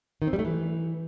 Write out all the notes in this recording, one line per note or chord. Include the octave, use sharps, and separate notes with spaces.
D#3
C4
G3
A3
E3